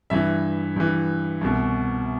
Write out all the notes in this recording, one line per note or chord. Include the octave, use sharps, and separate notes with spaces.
G2 E3 E5
G2 E3
C2 B2